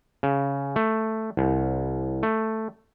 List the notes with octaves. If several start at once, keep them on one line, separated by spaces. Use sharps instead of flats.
C#3
A3
C2
A3